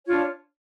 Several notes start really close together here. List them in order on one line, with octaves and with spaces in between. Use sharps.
C#5 F4 D4